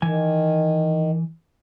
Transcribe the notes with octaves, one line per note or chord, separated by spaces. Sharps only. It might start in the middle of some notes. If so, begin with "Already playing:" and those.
D#3 E3 G#5